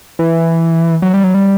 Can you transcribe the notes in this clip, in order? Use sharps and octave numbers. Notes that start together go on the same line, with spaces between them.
E3
F#3
G3
F#3
G3